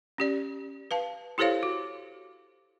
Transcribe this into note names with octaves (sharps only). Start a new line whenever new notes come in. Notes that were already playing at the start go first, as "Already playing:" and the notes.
C#4 G4 D5
B4 F5 A5
E4 G4 A4 C5 C#5 F5
F#4